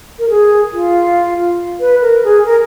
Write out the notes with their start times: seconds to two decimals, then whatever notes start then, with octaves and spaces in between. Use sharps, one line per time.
0.19 A#4
0.30 G#4
0.73 F4
1.80 B4
2.02 A#4
2.24 G#4
2.45 A#4